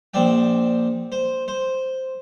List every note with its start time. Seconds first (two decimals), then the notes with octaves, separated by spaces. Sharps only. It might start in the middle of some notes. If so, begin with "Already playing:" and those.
0.14 A#1 C4 D4 D5 G5
1.12 C5
1.48 C5